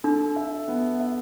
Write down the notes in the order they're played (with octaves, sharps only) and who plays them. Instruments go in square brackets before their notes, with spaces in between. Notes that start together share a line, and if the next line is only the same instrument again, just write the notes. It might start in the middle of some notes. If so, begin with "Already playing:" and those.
[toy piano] D4 [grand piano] A4
[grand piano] E5
B3
E5